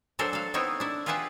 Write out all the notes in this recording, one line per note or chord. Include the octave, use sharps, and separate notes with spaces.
F#3 D4 F#4 A4 A#4 C5
A4 F5
B3 C4 D#4 E4 C#5
D4 E4
F4 G4 G#4 B4 E5 F#5